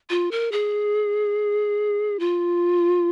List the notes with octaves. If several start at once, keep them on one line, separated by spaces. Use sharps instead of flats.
F4
A#4
G#4
F4